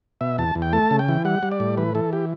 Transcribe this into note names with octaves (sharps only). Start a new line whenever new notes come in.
B2 E5
E2 A5
E2
G5
A3 A5
C#3
G5
E3
G3 F#5
G3
D5
A2
E3 B4
E3 A4
G4